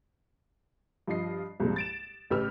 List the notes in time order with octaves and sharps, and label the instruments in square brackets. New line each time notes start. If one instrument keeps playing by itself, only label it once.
[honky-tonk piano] G2 F3 F4 D#5 C7
C2 G2 A#2 F3 G3 G#3
A6 D7 E7
A1 C#3 G4 B4 E6 F6